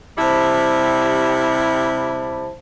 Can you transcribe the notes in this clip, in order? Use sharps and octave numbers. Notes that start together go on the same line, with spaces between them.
C3 G3 E4 C5 A5